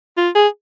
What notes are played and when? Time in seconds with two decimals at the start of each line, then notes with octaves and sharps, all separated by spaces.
0.17 F4
0.35 G#4